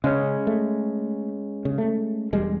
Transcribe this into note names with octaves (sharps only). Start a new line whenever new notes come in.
C#3 G#3 C#4
A3
C#3
A3
E1 G3 G#3